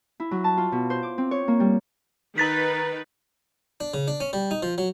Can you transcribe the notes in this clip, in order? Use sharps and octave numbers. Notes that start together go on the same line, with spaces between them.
E4
F#3
A5
F4
B2
C5
D6
C4
C#5
A#3
G3
D#3 D#4 B4 A#5 A6 B6
D4
C#3
D4
C#4
G3
D#4
F3
F#3